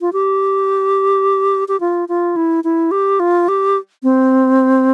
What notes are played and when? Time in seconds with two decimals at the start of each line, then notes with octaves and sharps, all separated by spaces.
0.01 F4
0.13 G4
1.68 G4
1.80 F4
2.09 F4
2.36 E4
2.64 E4
2.91 G4
3.20 F4
3.48 G4
4.03 C4